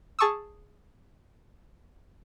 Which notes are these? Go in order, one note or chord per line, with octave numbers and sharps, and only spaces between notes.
G#4 A5 C#6 D#6 E6